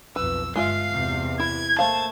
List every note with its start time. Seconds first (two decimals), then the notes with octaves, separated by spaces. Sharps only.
0.16 B1 F2 B4 E6
0.56 G1 G2 G#3 F4 E5 F5 C7
0.92 E2 C3
1.40 E4 G#6
1.79 A3 A#3 C5 F5 A5 G#6